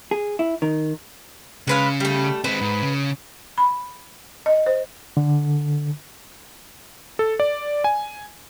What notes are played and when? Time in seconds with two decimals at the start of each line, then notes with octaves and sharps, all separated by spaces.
0.11 G#4
0.39 E4
0.62 D#3
1.67 C#3 G#3 B4 F5
2.00 G3 A3
2.44 G#3 C4 B4
2.61 G#2
2.82 C#3
3.58 B5
4.46 D#5
4.66 C5
5.17 D3
7.19 A4
7.40 D5
7.84 G#5